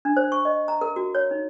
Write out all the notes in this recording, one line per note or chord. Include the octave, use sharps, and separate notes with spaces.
D4
C5
C#6
D#5
A#5
A#4
F#4
C#5
D#4